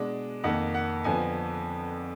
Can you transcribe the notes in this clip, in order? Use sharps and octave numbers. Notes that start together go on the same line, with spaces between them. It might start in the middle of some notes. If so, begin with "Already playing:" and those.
Already playing: B2 G#3 D4
F2 D#3 A#3 F#5
F#5
F2 D3 F3 B3 G#5